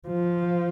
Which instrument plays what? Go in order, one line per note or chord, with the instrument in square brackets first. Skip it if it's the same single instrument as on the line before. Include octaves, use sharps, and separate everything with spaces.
[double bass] F3